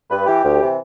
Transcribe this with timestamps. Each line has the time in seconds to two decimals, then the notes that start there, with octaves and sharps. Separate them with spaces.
0.10 G2 B4
0.26 E3 G4
0.43 D2
0.61 C3 E3